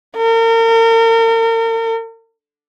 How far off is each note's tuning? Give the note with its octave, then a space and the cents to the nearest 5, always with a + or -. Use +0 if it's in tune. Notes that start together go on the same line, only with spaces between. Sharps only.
A#4 -40